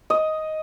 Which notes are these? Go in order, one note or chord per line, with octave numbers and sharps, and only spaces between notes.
D#5